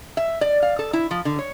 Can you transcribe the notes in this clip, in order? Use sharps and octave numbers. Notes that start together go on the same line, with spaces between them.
E5
D5
F5
A4
E4
F3
D3
C#5